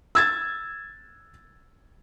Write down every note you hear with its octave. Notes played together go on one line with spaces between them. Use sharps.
E6 G#6 A6